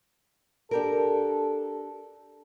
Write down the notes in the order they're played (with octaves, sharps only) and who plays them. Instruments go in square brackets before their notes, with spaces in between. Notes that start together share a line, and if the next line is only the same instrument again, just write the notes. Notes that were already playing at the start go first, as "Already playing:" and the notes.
[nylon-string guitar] D4 G4 A#4 [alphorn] A4